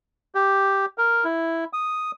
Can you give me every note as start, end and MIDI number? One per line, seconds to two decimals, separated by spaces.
0.35 0.86 67
0.98 1.24 70
1.24 1.64 64
1.73 2.11 87